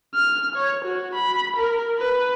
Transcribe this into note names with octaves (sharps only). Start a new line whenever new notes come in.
F6
C#5
F#4
B5
A#4
B4